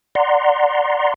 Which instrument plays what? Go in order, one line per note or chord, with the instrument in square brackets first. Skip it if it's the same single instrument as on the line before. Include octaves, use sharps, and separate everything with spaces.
[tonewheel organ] D5 F#5 A#5 C6